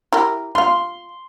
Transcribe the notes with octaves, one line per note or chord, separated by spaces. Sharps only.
E4 G4 A#4
F4 F5 C6